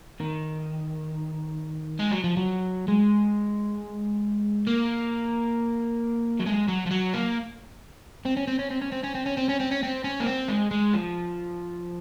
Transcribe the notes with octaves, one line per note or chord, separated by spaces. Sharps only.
D#3
G#3
F#3
F3
F#3
G#3
A#3
F#3
G#3
F#3
F3
F#3
A#3
C4
C#4
C4
C#4
C4
C#4
C4
C#4
C4
C#4
C4
C#4
C4
C#4
C4
C#4
A#3
C4
G#3
G#3
F3